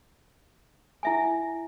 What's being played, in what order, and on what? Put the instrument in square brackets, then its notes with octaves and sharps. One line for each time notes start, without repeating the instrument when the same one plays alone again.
[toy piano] E4 E5 G#5